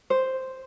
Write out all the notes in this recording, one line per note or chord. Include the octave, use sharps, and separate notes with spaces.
C5